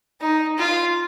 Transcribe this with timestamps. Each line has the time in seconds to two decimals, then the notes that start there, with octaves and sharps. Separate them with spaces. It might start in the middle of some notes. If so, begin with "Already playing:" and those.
0.20 D#4
0.58 F4